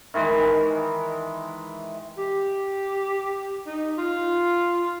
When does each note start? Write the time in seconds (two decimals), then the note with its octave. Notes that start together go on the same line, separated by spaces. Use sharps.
0.14 D#3 E3 G#3
2.18 G4
3.67 D#4
3.98 F4